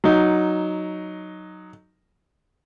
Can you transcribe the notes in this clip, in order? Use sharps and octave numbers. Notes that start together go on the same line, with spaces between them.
F#3 D#4